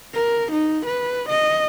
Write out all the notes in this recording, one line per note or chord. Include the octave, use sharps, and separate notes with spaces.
A#4
D#4
B4
D#5